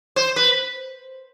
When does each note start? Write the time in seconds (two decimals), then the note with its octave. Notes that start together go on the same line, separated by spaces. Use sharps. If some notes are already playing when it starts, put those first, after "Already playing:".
0.16 C5
0.36 B4